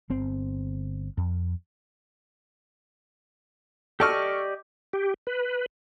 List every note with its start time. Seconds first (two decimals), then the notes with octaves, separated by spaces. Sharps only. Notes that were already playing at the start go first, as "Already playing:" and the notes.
0.10 G1 C4
1.17 F2
4.00 G4 A4 D5 D#5 C#6 F6
4.93 G4
5.27 B4